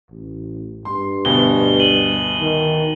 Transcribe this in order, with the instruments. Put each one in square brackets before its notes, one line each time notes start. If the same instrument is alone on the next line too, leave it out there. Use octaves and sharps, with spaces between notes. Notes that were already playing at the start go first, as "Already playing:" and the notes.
[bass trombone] A1
[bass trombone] G2 [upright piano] C6
[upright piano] D2 B2 [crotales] G7
[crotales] D#7 F#7
[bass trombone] D#3